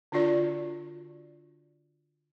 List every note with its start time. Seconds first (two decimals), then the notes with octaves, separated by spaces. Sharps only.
0.12 D3 D4 F4 F#4 D5